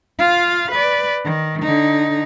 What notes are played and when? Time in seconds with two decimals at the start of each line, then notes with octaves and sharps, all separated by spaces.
0.18 F4 F5
0.71 B4 D5
1.24 D#3
1.62 D3 D#4